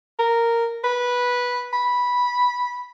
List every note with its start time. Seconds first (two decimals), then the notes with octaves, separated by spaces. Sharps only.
0.19 A#4
0.84 B4
1.73 B5